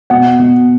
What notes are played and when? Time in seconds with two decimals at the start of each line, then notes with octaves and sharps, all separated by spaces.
0.10 B2 F#5
0.39 B2